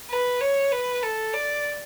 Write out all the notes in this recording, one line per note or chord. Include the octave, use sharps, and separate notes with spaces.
B4
C#5
B4
A4
D5